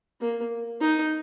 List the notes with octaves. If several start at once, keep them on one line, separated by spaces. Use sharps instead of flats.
A#3
D#4